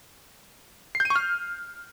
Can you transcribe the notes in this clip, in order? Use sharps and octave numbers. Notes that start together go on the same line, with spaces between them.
C7
G6
D#7
C#6
F6